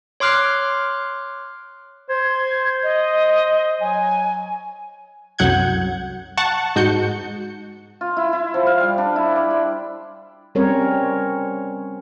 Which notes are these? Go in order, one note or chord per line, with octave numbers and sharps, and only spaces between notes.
C#5 C6 D6 F6 F#6 C7
C5 G#6
D#5
F#3 G#5
C2 F#2 F#3 F#5 G6 G#6
F#5 A5 C#6 F#6
G#2 F#4 G6 C#7
F4
E4
E4
F3
F5
G3
D4
E4
D5
C6
G3 C4 C#4 A#4 C#5